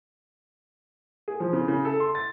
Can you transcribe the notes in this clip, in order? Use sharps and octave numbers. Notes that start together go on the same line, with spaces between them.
G#4
F3
C#3
C#3
A4
C6
A6